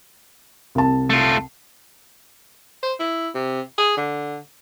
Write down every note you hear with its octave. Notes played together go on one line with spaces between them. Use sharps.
C2 A5
A3 F4
C5
E4
C3
G#4
D3